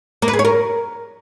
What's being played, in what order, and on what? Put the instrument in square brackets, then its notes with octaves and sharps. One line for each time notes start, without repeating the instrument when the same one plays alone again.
[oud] A#3
B4
G#4
C#5
A#4